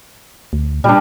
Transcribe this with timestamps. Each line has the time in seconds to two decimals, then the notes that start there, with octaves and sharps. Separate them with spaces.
0.53 D2
0.84 A#2 G3 D4